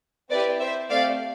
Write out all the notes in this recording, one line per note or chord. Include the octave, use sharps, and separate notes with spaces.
C4 E4 G4 B4 D5
C5 E5
A3 C4 G4 D5 F5